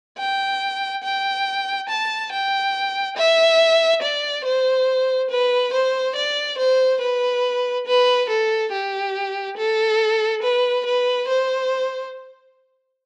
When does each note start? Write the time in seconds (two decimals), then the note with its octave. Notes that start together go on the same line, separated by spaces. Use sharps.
0.18 G5
1.03 G5
1.89 A5
2.31 G5
3.17 E5
4.02 D5
4.44 C5
5.31 B4
5.73 C5
6.16 D5
6.58 C5
7.01 B4
7.87 B4
8.29 A4
8.72 G4
9.57 A4
10.43 B4
10.85 B4
11.28 C5